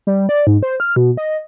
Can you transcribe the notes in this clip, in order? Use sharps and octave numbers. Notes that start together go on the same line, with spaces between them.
G3
D5
G#2
C5
F6
B2
D#5